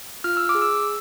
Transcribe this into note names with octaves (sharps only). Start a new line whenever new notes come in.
F4 F6
E6
D6
G#4
E6